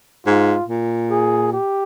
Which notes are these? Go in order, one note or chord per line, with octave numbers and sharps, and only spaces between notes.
G#2 F4
A#2
G#4
G4